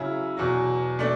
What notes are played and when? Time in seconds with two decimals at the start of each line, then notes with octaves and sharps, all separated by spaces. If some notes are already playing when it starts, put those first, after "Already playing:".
Already playing: C#3 F#3 C#4 E4
0.37 E2 B2 F#3
0.99 B2 A3 D4